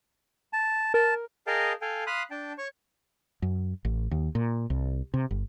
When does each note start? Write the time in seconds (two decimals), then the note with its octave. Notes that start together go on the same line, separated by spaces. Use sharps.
0.53 A5
0.94 A#4 A5
1.47 G#4 A#4 D#5 F5 G5 A5
1.81 A4 F5 G5 G#5
2.07 F5 B5 C6 D#6 F#6
2.31 D4 G5 A5
2.58 C#5 C#6
3.42 F#2
3.85 A1
4.11 D#2
4.35 A#2
4.70 C2
5.14 C3
5.31 G1